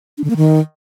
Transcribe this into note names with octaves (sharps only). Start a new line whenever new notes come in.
D4
D3
A#3
D#3